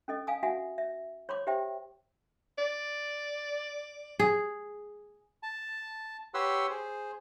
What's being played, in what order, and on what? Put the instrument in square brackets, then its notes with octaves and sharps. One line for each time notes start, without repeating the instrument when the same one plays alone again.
[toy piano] C#4 A4 D#5
F5 G#5 D#6
F#4 E5 F#5 G#5
E5
C#5 B5 C6 D6
G4 C5 E5 G5
[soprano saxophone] D5
[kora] G#4
[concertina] A5
G4 B4 C#5 F#5 C6 E6
G#4 C5